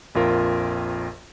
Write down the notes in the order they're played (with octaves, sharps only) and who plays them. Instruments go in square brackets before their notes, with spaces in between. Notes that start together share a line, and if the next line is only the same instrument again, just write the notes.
[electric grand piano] A#1 F2 F4 A#4